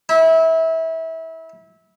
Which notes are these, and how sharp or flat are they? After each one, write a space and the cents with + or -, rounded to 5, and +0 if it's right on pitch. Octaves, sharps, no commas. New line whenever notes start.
E4 -25